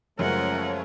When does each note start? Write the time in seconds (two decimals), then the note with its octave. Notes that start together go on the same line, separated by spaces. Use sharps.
0.19 F#2 C#3 F3 G#3 A3 A#4 C#5 F#5